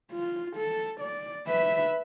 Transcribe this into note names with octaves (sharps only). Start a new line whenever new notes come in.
F4
A4
D5
B4 E5